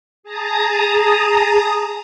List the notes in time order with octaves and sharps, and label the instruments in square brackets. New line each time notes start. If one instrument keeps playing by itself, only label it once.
[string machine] G#4 A5 A#5 D#6